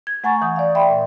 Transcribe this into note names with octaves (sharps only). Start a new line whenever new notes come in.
G#6
A3 F#5 G#5 A#5 C#6 A6
E3 D#6
D5 F5
D5 E5 G5 B5 C6
A#2